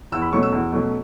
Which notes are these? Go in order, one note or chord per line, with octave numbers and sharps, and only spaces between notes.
E2 E6
B5
B2 F#3 A3 C#4 C#6
E6
E2
B2 F#3 A3 C#4